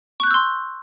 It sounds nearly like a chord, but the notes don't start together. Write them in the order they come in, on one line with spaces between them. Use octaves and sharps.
C#6 F#6 G6 E6 C6